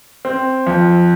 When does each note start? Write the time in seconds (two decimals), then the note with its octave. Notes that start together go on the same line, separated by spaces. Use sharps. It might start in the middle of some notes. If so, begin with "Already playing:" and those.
0.25 C4
0.67 F2